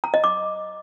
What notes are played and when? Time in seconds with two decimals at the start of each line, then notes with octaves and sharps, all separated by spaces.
0.04 A#5
0.14 D#5
0.24 D6